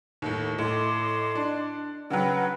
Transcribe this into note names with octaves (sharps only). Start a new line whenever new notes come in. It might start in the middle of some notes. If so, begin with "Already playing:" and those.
D#2 A2
A2 D#5 C6 D6
D4
C#3 F#3 B4 F#5 G5